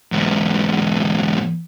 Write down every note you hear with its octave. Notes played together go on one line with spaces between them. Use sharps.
E2 G#2